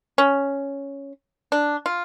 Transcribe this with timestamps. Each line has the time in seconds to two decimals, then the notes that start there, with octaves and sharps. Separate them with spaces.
0.18 C#4
1.52 D4
1.86 F4